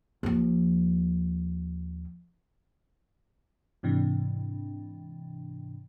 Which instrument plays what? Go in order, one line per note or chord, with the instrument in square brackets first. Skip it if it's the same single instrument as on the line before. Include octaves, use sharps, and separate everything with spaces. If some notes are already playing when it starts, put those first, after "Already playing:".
[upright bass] D#2 F3
[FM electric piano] G#2 C3 E3 D4